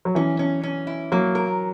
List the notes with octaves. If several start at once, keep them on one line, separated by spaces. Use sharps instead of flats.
F#3
E3 C#4
C#4
C#4
E4
F#3 A#3
A#4